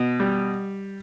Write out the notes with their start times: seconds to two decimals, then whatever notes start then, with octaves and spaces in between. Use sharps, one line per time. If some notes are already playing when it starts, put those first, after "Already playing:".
Already playing: B2
0.20 G3